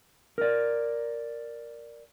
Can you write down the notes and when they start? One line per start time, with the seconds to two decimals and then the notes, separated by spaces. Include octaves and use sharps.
0.38 A#4 D5